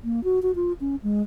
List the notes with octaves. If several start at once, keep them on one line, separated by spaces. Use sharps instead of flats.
A#3
F#4
F#4
F4
C#4
G#3